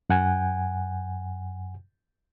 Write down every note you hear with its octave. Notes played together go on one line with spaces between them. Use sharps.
F#2 F#5 G#5